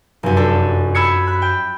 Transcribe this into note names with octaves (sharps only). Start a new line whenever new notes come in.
F1 F#2
D4 A4
B5 E6 G#6 C#7
B5 F#6
G5